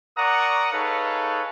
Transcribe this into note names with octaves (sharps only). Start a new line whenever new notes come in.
A#4 D5 F#5 A#5 C#6 D#6
D#4 G#4 A4 B4 C#5 F5